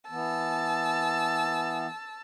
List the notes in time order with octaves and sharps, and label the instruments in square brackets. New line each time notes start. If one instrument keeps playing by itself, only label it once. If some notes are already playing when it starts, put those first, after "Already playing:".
[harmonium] E3 B3 [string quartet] A5 E6